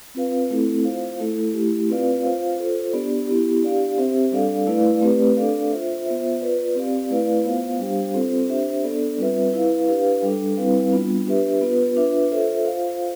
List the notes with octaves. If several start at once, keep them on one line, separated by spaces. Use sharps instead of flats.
C4 F4 B4 F5
A3 C4 E4 A4
F4 C5 F5
A3 E4 A4
A3 E4 G4
C4 F4 B4 D5 F5
F4 C5 F5
F4 A4 C5
B3 D4 G4 D5
B3 E4 G4
D4 G4 D5 F5
C4 G4 C5 E5
G3 D4 A4 D5 F5
A3 E4 B4 D5 F5
A3 C4 G4 B4 D5
D4 A4 D5 F5
F4 C5 E5
B3 F4 C5 E5
F4 B4 D5
C4 G4 D5 F5
A3 E4 B4 D5 F5
B3 F4 C5 F5
G3 D4 G4 C5 F5
C4 F4 A4 C5
D4 G4 C5 E5
B3 D4 A4 D5
G3 C4 F4 B4 E5
E4 B4 F5
D4 G4 B4 F5
G3 D4 A4
G3 C4 E4 B4 F5
G3 B3 D4 F4
D4 G4 B4 E5
B3 F4 B4
D4 F4 B4 E5
F4 A4 C5 E5
F4 C5 F5